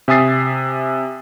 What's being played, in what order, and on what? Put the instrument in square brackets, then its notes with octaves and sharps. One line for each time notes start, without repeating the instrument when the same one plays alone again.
[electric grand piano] C3 E5 G#5 D#6 A6 C7